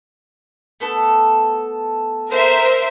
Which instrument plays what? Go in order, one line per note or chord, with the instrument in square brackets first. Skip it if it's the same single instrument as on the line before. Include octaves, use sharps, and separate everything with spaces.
[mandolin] A3 B3 A4
[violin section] A#4 C5 E5